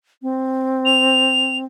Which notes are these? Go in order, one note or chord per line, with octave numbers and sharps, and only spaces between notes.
C4
F7